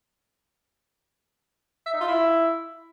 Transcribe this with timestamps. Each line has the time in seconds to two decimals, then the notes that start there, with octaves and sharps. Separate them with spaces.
1.86 E5
1.93 D#4
2.00 F4
2.07 E4